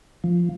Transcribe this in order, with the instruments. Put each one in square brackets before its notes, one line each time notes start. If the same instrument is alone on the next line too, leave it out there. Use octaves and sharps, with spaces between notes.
[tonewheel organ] F3